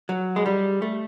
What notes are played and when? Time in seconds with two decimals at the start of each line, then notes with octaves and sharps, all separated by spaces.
0.09 F#3
0.36 G#3
0.46 G3
0.82 A3